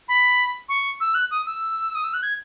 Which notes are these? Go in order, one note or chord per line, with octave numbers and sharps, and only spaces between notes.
B5
C#6
E6
F#6
D#6
E6
D#6
E6
F#6
G#6